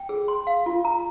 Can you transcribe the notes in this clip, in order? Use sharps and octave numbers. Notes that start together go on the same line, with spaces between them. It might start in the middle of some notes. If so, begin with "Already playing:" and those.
Already playing: G5
G#4
C6
F5
F4
A#5